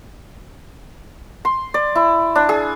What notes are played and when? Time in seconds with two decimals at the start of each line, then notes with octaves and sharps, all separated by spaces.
1.45 C6
1.74 D5
1.95 E4
2.35 D4
2.49 G#4